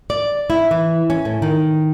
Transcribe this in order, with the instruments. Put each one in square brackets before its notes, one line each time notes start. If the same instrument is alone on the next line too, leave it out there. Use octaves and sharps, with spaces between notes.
[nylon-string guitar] D5
E4
E3
C#4
A2
D#3